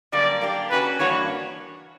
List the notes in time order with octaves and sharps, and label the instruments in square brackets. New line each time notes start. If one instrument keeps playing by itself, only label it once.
[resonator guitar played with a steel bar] F#2 D3 G3 A#3 [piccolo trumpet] D5
[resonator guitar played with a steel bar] A#3 D4 G4
[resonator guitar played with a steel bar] F#2 C#3 F#3 C#4 F#4 [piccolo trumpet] B4
[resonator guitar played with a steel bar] G2 E3 A#3 D4 F#4 [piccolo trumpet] C#5